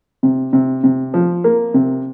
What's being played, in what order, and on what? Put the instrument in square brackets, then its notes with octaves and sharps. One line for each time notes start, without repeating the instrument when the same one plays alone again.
[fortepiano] C3
C3
C3
F3
A#3
C3